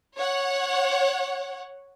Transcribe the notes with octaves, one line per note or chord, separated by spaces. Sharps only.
C#5 F#5